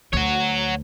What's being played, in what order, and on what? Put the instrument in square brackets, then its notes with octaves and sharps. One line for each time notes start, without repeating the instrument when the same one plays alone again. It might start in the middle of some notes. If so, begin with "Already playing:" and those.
[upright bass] D2 [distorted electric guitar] C#5 F#5